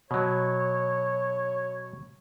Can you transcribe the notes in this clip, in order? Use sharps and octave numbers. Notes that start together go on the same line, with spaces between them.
B2 F#3 C#5